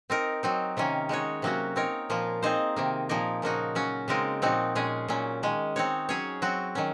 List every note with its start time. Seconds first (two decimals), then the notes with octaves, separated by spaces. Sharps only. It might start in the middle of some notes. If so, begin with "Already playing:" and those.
0.10 C4 D#4 A#4
0.43 F#3 C4 D#4
0.77 C3 D#3 A#3 C#4
1.09 G#3 D#4 F#4 C#5
1.42 C3 F#3 A#3 C#4 F#4
1.76 C4 D#4 A#4 C#5
2.10 A#2 F3 A#3 F4
2.43 C4 D#4 G#4 C5
2.76 C3 D#3 A#3
3.09 A#2 F3 A#3 D#4 A#4
3.42 C#3 F3 A#3 D#4 F#4
3.75 F#3 C#4 F#4
4.08 C#3 G#3 C4 D#4 A#4
4.42 A#2 F3 C4 D#4 F#4
4.75 A#2 G#3 C#4 G#4
5.08 A#2 F#3 C#4
5.43 D#3 G#3 C#4
5.76 C4 D#4 F#4 C#5
6.09 F#3 C#4 G#4 C#5
6.42 F#3 C4 F#4
6.75 D#3 F#3 C#4